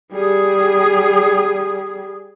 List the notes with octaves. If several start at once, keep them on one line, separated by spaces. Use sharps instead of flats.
G3 G#4